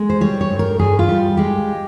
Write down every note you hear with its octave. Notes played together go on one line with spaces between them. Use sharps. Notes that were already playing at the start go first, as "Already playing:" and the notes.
Already playing: G#3
C5
G3 C#5
C#5
G2
A#4
G2 G#4
F4
G3
G#3 G4